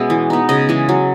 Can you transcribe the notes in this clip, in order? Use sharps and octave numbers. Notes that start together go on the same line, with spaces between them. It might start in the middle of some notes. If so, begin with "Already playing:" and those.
Already playing: B2 G#3 B3 C#4 E5
E3
B3 D#4
C#3 D#5
E3 G#3
F#3